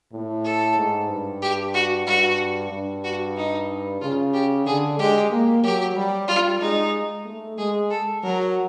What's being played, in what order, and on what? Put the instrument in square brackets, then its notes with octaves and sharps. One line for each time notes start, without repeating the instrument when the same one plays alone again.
[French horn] A2
[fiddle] A4
[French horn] G#2
G2
[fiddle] G4
F#4
[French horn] G2 [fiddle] F#4
[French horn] G2
[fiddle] F#4
D#4
[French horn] C#3 [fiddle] F4
[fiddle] G4
[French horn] D3 [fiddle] G#4
[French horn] G#3 [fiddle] G4
[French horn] A#3
[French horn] F#3 [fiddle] G4
[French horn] G3
[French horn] G3 [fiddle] F4
[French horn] G#3 [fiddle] D#4
[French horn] A3
[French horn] G#3 [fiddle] G#4
[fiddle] A4
[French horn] F#3 [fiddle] A#4